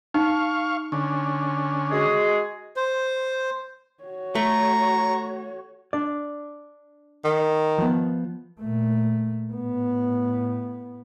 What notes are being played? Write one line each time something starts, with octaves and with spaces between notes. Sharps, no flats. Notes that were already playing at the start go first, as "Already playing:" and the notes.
D#4 F5 C#6
D3 C#4
G#3 F#4 G#4
C5
F#4 C#5
A3 A#5 C#6
D4 D5
D#3
F3 B3
A#2 A3
A2 B3